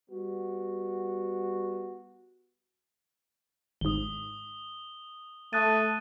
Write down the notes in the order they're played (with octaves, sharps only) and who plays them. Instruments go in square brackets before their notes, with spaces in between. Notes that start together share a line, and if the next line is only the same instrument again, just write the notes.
[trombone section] G3 B3 F#4
[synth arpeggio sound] G#1 G#2 [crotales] D#6 G7
[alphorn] A3 [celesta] A5 D#6 A6 [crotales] F#6 D#7